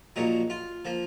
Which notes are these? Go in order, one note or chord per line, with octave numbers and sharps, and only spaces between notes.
A#1 A#2 F#3 D#4
F4
F3 A#3